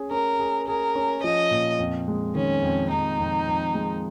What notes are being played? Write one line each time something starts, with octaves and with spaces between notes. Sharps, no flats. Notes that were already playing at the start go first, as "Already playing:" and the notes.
Already playing: C#4 G#4
C#4 A#4
G#4
G#4 A#4
C#4
F3 D#5
A#2
F2
G#3
D#3 C#4
F2
F2 D#4
F2
F2
G#3